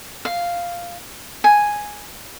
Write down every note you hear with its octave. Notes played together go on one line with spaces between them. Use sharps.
F5
G#5